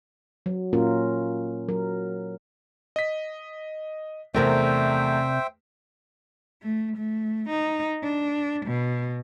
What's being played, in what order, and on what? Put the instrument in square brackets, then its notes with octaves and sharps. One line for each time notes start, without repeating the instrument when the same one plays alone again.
[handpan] F#3
A#2 A#3 C#4 F4 A#4
F#3 A#4
[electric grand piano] D#5 B6
[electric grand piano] E2 A3 [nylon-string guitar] C3 A#4 D5 [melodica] C5 E5 G5
[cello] A3
A3
D#4
D4
B2